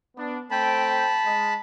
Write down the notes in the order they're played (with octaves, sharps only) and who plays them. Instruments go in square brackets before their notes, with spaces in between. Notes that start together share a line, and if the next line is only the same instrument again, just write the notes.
[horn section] B3 D4
[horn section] A3 C4 G5 [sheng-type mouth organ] A5 B5
[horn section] G#3